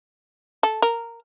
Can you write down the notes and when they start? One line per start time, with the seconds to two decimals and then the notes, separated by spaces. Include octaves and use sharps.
0.63 A4
0.82 A#4